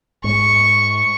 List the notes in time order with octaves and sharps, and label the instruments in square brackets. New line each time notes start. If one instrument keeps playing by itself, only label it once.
[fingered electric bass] G#2 [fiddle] C#6